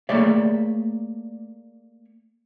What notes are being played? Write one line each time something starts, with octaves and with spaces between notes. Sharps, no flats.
A3 A#3 G#4 C#5 D5 E5